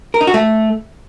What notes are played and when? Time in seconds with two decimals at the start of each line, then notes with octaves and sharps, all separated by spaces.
0.14 A#4
0.21 D#4
0.27 F#4
0.34 A3